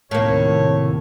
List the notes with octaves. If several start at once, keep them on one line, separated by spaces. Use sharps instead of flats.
D#2 A2 C3 A#3 C#5